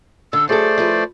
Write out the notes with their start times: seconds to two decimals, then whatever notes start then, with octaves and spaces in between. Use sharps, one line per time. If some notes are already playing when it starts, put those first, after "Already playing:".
0.33 D3 E6
0.49 F#3 A3 G#4 A4 C5 D5
0.78 F3 E4 B4